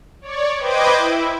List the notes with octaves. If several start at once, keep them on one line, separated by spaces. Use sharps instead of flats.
C#5 D5
B4 C5 D#5 G5 D6 G#6
E4